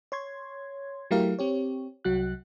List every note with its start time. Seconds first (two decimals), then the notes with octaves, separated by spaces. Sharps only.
0.12 C#5 C6 G#6
1.11 F#3 A3 E4 G4 A#4 F5
1.39 C4 G4 C#5
2.04 C2 F#3 F#4 F#6